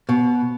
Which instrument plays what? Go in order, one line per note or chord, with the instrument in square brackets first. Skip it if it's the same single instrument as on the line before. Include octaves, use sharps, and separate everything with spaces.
[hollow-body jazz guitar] B2